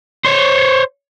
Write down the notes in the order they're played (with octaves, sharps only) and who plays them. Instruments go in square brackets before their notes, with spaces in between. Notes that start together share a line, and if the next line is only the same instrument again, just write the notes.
[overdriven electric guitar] C5 C#5